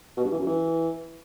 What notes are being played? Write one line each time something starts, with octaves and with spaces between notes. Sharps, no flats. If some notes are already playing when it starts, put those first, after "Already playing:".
B2
G2
E3
F#2
E3